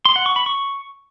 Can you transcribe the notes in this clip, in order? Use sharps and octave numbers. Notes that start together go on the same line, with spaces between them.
C6
F#5
C#6
B5
C#6